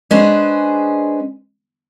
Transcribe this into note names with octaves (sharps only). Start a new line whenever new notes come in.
G#3 C#4 D4 G#4 B4 C5